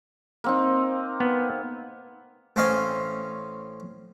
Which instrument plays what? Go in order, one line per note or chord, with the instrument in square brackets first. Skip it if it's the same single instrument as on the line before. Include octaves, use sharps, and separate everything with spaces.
[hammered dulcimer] A#3 C4 D#4
[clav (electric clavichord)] B3
[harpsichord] A1 C4 C#4 D#5 F5 G#5